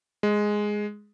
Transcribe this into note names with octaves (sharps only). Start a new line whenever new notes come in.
G#3